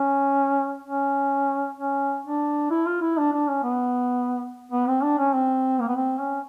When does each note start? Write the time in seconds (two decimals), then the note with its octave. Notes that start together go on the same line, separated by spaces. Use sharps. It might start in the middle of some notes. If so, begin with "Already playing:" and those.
Already playing: C#4
0.85 C#4
1.78 C#4
2.25 D4
2.71 E4
2.86 F4
3.01 E4
3.18 D4
3.33 D4
3.48 C#4
3.63 B3
4.72 B3
4.88 C4
5.03 D4
5.18 C#4
5.34 C4
5.81 A#3
5.88 B3
5.96 C4
6.19 C#4